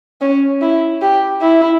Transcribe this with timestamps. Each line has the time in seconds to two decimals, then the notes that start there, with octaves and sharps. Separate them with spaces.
0.21 C#4
0.61 E4
1.01 G4
1.41 E4